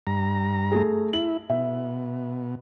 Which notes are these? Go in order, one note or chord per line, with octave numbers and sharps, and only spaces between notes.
G2 A#5
A3 G#4
E4 F#7
B2 E5